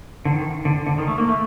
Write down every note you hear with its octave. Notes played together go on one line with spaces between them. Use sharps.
D3
D#3
D3
D3
D#3
A3
A#3
A3